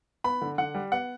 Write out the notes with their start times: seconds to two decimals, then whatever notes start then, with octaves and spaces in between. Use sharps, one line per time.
0.24 B3 B5
0.42 D3
0.58 D3 F#5
0.75 G3
0.92 B3 F#5